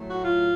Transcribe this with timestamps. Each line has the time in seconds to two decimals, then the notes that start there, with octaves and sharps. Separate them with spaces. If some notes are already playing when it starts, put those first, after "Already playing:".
Already playing: A2 F#3 A3
0.09 F#4
0.23 F4